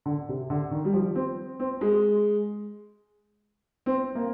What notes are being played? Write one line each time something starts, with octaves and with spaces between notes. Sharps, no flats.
D3
C3
D3
D#3
G3
F3
C4
C4
G#3
C4
A#3